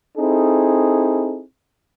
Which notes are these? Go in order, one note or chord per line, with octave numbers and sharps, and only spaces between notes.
C4 D#4 E4 G#4 A4